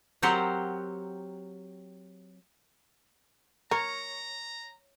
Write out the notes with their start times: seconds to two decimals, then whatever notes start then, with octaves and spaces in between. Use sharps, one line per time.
0.22 F#3 C4 G4 A#4 C5 F#5
3.71 A#4 C#5 A#5